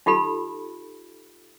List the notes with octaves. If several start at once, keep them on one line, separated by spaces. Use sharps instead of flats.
D#4 F4 G4 A4 B5